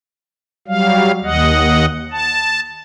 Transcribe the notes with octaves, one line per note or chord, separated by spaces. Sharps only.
F#3 G3 F5
D#2 D#5 F#5
A5